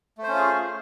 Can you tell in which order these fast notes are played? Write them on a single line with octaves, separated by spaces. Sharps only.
A3 C5 C#4 F4 G#4